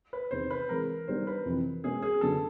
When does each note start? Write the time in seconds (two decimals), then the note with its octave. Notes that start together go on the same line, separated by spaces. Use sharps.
0.13 B4
0.31 E2 C3 D#3 C5
0.50 B4
0.69 E3 G#3 C4 A#4
1.08 D#3 G3 B3 D4 C5
1.27 B4
1.45 F2 C3 E3
1.84 B2 G#3 C#4 G#4
2.03 G#4
2.21 F#2 D3 F#3 B3 A4